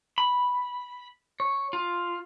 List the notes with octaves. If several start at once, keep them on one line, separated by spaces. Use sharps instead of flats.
B5
C#5
F4